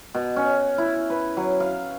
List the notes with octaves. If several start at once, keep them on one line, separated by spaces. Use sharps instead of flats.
B2
C#4
E4
B4
F#3
F5